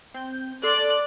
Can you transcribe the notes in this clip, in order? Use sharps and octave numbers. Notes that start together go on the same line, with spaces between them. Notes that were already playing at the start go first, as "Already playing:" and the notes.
C4 G6
A4 D5 C6 F#6